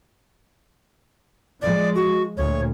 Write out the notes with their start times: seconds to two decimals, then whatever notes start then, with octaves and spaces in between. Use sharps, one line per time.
1.62 F3 G#3 D5
1.95 F#4
2.37 D2 A#2 C#5